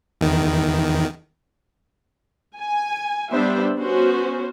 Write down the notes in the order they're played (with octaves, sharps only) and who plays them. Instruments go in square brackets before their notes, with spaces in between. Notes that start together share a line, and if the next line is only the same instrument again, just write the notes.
[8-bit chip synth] E2 D#3
[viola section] G#5
G3 B3 D4 C5 E5
B3 C#4 F#4 C5